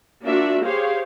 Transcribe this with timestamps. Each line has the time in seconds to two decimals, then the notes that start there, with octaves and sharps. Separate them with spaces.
0.24 A#3 D4 F4 F#4 E5
0.64 G4 G#4 C5 C#5 F5